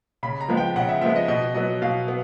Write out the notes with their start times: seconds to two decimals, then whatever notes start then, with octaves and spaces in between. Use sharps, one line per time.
0.23 C#3 B5
0.41 A#5
0.48 F3 G#3 B3
0.57 G5
0.76 C#3 F#5
0.89 E5
1.01 F3 G#3 B3 E5
1.16 D#5
1.28 B2 D#5
1.54 F#3 B3 D#5
1.82 B2 F5
2.08 B3